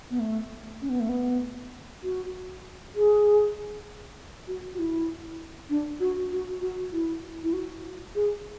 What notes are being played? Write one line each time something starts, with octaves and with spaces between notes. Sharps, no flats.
B3
A3
C#4
B3
A3
B3
F#4
G#4
F#4
F#4
E4
D4
F#4
F#4
F#4
E4
E4
F#4
G#4